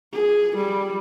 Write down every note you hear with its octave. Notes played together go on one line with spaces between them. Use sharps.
G#4
G3